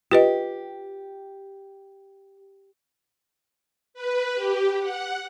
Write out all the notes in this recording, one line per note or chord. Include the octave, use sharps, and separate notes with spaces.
F4 G4 B4 D#5
B4
G4
F#5